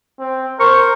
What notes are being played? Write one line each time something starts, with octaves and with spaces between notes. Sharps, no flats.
C4
A#4 C5 C#6